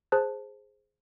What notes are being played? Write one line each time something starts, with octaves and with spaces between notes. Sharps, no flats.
G#4 C5 A5 F#6